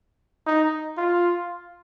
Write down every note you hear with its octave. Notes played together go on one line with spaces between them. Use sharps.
D#4
F4